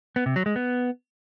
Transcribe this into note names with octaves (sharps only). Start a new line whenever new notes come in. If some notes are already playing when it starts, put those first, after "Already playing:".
B3
C3
F#3
G#3
B3